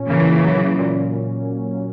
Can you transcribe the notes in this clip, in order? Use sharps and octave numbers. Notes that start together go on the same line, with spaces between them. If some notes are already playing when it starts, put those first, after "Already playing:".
Already playing: A#2 C#4
C#3 E3 A#3
F#3
A#2